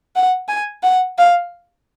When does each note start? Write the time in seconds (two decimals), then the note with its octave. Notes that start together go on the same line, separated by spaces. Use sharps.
0.16 F#5
0.49 G#5
0.83 F#5
1.18 F5